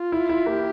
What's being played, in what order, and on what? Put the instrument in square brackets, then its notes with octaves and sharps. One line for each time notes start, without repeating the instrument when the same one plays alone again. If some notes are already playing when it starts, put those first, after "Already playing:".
Already playing: [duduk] F4
[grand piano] E4
E4
[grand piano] A#3 [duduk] G4